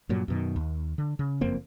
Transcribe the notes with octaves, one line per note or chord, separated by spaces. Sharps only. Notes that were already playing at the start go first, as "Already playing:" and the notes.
G2 A#2 F#3
F#2 B2 D#3
D#2
D3
C#3
F#1 F2 A#3 C4